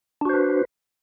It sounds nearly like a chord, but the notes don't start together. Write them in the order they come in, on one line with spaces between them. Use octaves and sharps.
D4 F#4 C5 B4